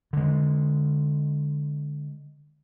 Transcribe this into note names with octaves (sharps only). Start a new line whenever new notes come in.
D3 G#3